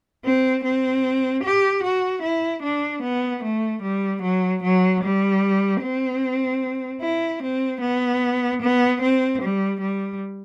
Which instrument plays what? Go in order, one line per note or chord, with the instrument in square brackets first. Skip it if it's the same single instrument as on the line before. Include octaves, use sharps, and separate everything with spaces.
[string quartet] C4
C4
G4
F#4
E4
D4
B3
A3
G3
F#3
F#3
G3
C4
E4
C4
B3
B3
C4
G3
G3